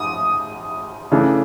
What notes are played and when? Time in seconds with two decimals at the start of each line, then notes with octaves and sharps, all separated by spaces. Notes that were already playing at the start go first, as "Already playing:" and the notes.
Already playing: D#6
1.12 C#3 E3 A3 D4